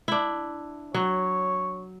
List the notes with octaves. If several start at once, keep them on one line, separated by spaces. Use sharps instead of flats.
D4 E4
F#3 C#5